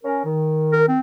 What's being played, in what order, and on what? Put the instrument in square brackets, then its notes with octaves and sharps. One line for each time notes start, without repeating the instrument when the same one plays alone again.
[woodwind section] C#4 A#4
D#3
[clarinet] A#4
C4